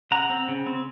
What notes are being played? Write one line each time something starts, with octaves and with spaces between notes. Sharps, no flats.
C#3 F#5 A#5
C4
C#3
C4